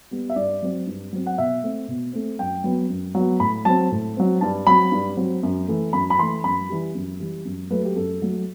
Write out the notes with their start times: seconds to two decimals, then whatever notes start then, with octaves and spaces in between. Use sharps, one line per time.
0.11 G3 B3
0.30 E5
0.36 G2 D5
0.62 F#3 C4
0.87 G2
1.13 F#3 C4
1.27 F#5
1.38 B2 E5
1.63 A3 C4
1.88 B2
2.13 A3 C4
2.39 F#2 G5
2.64 F#3 B3
2.90 F#2
3.15 F#3
3.20 B3
3.40 A2 B5
3.65 F#3 C4 A5
3.91 A2
4.17 F#3 C4
4.41 G2 A5
4.67 F#3 C4 B5
4.92 G2
5.17 F#3 C4
5.43 F#2
5.68 E3 A3
5.93 F#2 B5
6.10 B5
6.18 E3 C6
6.22 A3
6.44 F#2 B5
6.69 E3 G3
6.95 F#2
7.20 E3 G3
7.45 F#2
7.70 F#3 A3 B4
7.85 G4
7.96 F#2 A4
8.21 F#3 A3